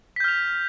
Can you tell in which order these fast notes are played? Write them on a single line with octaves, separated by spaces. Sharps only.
B6 G6 F6 F7